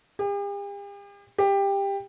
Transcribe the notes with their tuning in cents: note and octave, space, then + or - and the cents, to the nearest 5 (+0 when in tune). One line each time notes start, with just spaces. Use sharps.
G4 +45
G4 +15